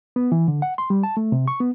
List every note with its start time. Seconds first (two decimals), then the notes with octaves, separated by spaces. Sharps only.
0.16 B3
0.32 E3
0.48 D3
0.62 F#5
0.78 C6
0.90 G3
1.03 A5
1.17 A3
1.32 C3
1.48 C#6
1.60 B3